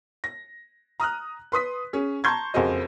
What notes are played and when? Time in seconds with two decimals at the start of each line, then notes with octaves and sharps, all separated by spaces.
0.24 A#6
1.00 A#5 D#6 F6 F#6
1.52 B4 C6 D#6 B6
1.93 C#4 G#4
2.24 A5 A#5 C6 C#6 G6 G#6
2.54 F#1 F2 F#4 G#4 C5 D#5